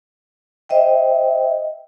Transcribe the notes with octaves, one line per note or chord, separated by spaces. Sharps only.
C5 D#5 E5 G5